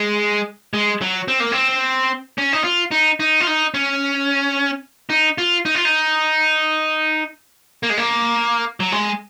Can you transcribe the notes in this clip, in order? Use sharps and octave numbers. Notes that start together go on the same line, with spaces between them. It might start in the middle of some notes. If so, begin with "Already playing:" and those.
Already playing: G#3
G#3
F#3
C4
A#3
C4
C#4
D#4
F4
D#4
D#4
F4
D#4
C#4
D#4
F4
D#4
F4
D#4
A#3
G#3
A#3
F#3
G#3